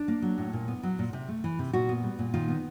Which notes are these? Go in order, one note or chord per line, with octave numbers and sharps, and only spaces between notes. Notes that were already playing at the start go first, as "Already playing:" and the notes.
Already playing: D4
A#3
F#3
A2
A#2
B3
F#3
A#2
C3
A3
E3
C3
A#2 F#4
B3
G3
A#2
D#3 F4
B3